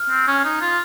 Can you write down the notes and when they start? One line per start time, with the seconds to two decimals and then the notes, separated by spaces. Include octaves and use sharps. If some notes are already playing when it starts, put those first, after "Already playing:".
Already playing: F6
0.10 C4
0.27 C#4
0.44 D#4
0.61 F4